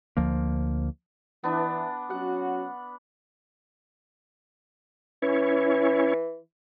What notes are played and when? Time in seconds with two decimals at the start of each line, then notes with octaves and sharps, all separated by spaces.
0.17 D2 F3 A#3
1.44 E3 B3 D4
2.10 F#3 C#4 F#4 F#5
5.22 E3 C#4 E4 C#5